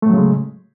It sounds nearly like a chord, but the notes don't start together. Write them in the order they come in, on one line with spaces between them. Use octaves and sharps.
A3 A2 F#3 C#3 G#3